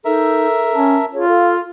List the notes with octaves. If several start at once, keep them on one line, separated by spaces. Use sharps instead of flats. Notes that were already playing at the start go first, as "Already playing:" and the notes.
D#4 A4 A#4 E5
C#4 A5
F4 G#4 C#5
A4 F5